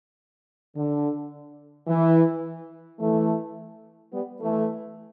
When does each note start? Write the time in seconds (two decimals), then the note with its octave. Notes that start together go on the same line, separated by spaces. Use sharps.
0.75 D3
1.88 E3
2.99 E3 A3
4.12 G3 B3
4.39 E3 A3